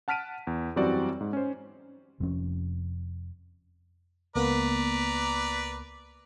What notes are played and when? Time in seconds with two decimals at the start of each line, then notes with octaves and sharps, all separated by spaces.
0.08 F#5 A5 F6 B6 D7 D#7
0.47 E2
0.76 F#2 E3 G3 C4 F#4 D5
1.21 G#2
1.33 C#4 C5
2.20 F1 F2 F3 C#4
4.36 C#2 A#3 B3 B4 D5 A#5